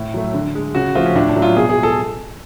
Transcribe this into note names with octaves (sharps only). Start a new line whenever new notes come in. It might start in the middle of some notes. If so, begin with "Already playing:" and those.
Already playing: A2
F#3 A3
D3
G#3
C#3 F#4
F3 A3 F4
C#4
A2 D4
D4
F#3 A3
F4
B2 G#4
G#4
G#3
A4